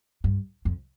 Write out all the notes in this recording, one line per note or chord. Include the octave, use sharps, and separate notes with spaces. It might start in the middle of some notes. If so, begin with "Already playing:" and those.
G2
F2